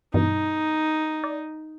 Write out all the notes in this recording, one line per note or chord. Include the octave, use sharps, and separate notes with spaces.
G2 B2 E3 D#4
D5